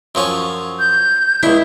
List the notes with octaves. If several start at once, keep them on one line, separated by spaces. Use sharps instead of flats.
F#2 F3 C#4
G6
C#2 D4 E4